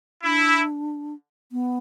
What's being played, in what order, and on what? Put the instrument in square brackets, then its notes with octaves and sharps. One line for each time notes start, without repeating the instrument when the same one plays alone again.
[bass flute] D4 [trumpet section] E4
[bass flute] B3